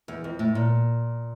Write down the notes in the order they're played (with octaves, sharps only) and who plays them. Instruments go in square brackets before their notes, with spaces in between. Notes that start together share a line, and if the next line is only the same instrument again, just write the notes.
[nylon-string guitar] E2
F2
A2
A#2